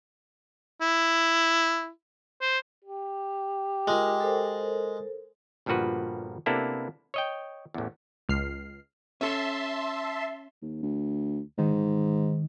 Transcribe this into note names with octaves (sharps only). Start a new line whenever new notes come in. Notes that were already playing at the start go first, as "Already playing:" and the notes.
E4
C5
G4
G#3 F4 A#4
A4 A#4 C5
G1 G2 A#2 F3 F#4 B4
C3 A#3 B3 D4 E4 A4
C#5 D#5 G5
A1 E2
C#2 F6 C7
C#4 A4 E5 A5 C6
D#2
D2
G#2 D#3